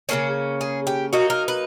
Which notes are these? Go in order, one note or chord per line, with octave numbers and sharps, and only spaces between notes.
C#3 F#3 A#3 C#4 G#4
G#4
G4
F#3 A#3 D#4 F#4
A#4
B4